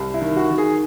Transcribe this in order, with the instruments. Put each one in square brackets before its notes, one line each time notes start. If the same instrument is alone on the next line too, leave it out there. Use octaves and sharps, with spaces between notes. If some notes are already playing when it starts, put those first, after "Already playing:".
Already playing: [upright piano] C2
E4
D#3
F#4
D#3
G#4